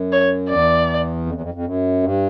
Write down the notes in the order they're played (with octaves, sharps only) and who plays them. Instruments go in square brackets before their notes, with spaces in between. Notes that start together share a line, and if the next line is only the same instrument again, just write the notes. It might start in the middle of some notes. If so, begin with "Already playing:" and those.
Already playing: [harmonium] F#2
[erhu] C#5
[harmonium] E2 [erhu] D5
[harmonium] F2
E2
F2
F2
F#2
G2